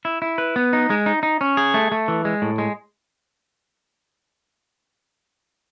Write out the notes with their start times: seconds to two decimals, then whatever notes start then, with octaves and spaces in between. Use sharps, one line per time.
0.05 E4
0.22 E4
0.38 B4
0.56 B3
0.73 D#4
0.90 G#3
1.06 D#4
1.23 D#4
1.41 C#4
1.57 G#4
1.74 A3
1.92 A3
2.08 E3
2.25 G#3
2.42 A2
2.58 G#3